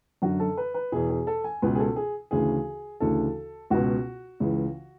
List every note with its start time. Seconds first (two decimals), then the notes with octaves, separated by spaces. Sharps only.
0.22 F#2 D3 F#4
0.40 A4
0.57 B4
0.74 B4
0.92 E2 B2 G#4
1.10 G#4
1.27 A4
1.44 G#5
1.62 C#2 B2 B4
1.75 G#4
1.80 A4
1.96 G#4
2.31 D2 C#3 E3 G#4
3.00 D2 C#3 E3 A4
3.70 C#2 B2 F#4
4.40 C#2 C#3 E3